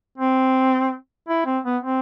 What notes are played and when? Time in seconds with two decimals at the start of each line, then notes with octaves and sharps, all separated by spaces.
0.18 C4
1.28 E4
1.46 C4
1.65 B3
1.83 C4